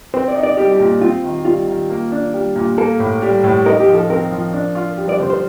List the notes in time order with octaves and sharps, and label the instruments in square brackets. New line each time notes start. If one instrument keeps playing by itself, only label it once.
[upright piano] C4 [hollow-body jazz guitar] C5
[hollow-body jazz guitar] D5
[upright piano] D#4
[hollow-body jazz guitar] D5
[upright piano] G3 [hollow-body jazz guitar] G4
[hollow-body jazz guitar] G4
[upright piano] A#2
[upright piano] C4 [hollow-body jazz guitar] F4
[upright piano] D#3
[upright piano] G3 [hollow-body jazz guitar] F4
[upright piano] D#3
A#3
D4
G3
A#2
[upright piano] A#3 [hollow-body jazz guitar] A4
[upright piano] A2
G3
A2
[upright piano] D#4 [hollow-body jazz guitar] A#4
[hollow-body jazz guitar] G4
[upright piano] F3
[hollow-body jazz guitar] A4
[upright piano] C4 [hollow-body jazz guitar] A#4
[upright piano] F3
D4
F4
G3
[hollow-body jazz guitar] D5
[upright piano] D3 [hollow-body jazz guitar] C5
[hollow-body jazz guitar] C5